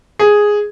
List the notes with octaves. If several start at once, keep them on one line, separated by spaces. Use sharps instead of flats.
G#4